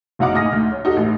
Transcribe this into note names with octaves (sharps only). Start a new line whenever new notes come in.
F#1 F#3 D#4 F5 F#5 D6
A2 D#4 G#5 D#6 F6 A#6
D2
C#5
D#4 F#4 G4 A4
A1